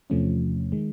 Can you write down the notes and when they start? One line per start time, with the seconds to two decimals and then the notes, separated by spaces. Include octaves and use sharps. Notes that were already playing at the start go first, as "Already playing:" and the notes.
0.10 E2 C3 F3 A3 C#4
0.72 D#3 G#3